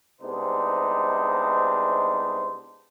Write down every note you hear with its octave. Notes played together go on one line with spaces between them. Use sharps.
C2 G#3 B3 D4 D#4 C5